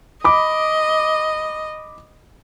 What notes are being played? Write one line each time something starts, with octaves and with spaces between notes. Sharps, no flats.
D#5 B5 D6